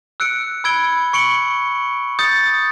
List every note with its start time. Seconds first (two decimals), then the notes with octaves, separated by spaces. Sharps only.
0.20 E6 F#6 C#7 D7
0.64 B5 E6 G#6 D7 G7
1.13 C#6 C#7 D7 F#7 G7
2.19 D#6 G6 A6 C#7